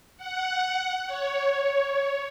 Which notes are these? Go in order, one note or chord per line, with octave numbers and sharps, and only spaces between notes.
F#5
C#5